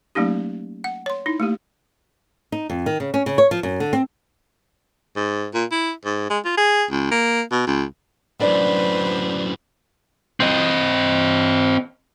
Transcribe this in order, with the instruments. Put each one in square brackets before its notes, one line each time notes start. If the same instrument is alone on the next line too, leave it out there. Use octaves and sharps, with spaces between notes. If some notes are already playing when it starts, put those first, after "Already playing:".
[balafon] F#3 A3 A#3 C#4 D#4 G4
F#5
C#5 C6
D#4 E4
A3 A#3 G4
[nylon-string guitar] D#4
F2
D#3
C#3
C#4
C#3
C#5
F3
F#2
D3
C4
[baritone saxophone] G#2
A#2
E4
G#2
G#3
F4
G#4
C#2
A#3
B2
C#2
[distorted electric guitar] F#2 A2 [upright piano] D4 [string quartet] B4 C5
[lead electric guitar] C4 D#5